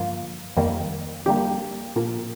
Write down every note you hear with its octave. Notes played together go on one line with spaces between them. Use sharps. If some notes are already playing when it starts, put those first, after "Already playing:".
Already playing: G2 D3 F3 A#3 F4
F2 D#3 G3 A#3
F2 D3 G3 A#3 G4
A#2 F3 A#3